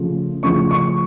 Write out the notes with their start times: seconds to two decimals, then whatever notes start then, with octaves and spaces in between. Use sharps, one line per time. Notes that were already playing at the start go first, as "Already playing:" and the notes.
Already playing: C#3 F3 A3
0.43 C#3 F3 A3 C#6
0.71 C#6